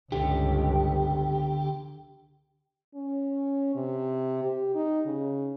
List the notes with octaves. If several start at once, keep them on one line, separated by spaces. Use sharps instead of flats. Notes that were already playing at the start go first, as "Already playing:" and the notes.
C#2 G2 D3 G4
C#4
C3
G4
D#4
C#3